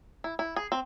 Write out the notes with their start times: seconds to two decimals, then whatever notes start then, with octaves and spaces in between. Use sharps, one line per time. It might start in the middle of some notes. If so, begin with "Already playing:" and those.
0.24 E4
0.39 E4
0.56 G#4
0.72 C4